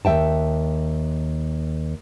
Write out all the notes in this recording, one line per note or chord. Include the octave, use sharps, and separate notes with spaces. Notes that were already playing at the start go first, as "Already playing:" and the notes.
D#2 G#2 E5 G5 A5